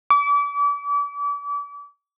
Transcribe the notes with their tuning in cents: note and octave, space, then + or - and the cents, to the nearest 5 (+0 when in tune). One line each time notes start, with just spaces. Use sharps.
D6 -35